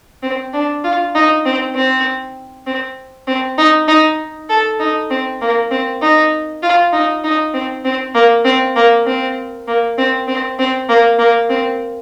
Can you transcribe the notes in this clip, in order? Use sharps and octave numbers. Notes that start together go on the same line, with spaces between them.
C4
D4
F4
D#4
C4
C4
C4
C4
D#4
D#4
A4
D#4
C4
A#3
C4
D#4
F4
D#4
D#4
C4
C4
A#3
C4
A#3
C4
A#3
C4
C4
C4
A#3
A#3
C4